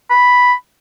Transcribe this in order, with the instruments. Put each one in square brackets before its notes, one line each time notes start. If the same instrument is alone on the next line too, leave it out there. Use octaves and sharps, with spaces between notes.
[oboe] B5